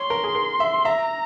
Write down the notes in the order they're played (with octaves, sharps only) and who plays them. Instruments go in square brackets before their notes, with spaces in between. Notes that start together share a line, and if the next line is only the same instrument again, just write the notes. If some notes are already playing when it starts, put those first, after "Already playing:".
Already playing: [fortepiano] C#5 [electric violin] C6
[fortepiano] A#4
G#4
A#4
E5
[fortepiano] E5 [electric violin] A#5